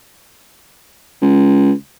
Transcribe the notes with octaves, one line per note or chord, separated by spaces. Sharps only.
C#2